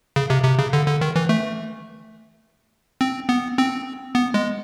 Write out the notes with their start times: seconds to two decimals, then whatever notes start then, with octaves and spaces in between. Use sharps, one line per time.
0.16 C#3
0.30 C3
0.44 C3
0.59 C#3
0.73 D3
0.87 D3
1.01 D#3
1.16 E3
1.29 A3
3.01 C4
3.29 B3
3.58 C4
4.15 B3
4.34 G#3